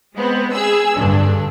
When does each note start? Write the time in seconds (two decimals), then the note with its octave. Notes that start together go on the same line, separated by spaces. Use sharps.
0.15 G#3 B3 C4
0.52 G#4 E6
0.96 G2 D3 D4